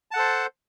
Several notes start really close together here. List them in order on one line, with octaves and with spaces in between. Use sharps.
A5 F#5 A4 C5